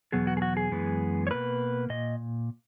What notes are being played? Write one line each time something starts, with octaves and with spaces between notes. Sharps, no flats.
E2 B2 F#3 B3 G#4
F#4
G#4
F#4
G#4
F#2 E3 G#3 B3
C#5
B2 A#3 B4
A#2 D#5